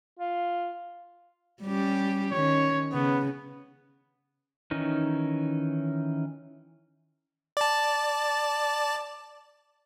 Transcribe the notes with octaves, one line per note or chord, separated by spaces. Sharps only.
F4
G3 C#4 G4
D#3 C#4 C#5
C#3 B3
D#3 E3 C#4 D#4
D5 A5